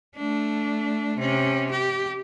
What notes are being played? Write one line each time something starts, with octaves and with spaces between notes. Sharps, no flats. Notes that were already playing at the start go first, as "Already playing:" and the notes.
A3 D4
C3 C#4
G4